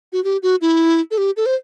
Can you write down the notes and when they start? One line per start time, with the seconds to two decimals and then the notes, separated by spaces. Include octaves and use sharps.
0.13 F#4
0.24 G4
0.43 F#4
0.61 E4
1.11 A4
1.18 G4
1.37 A4
1.46 C5